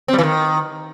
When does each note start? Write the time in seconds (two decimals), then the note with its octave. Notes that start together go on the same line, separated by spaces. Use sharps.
0.08 C4
0.13 G3
0.18 E3
0.24 D#3